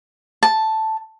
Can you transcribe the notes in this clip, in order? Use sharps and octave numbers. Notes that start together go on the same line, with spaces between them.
A5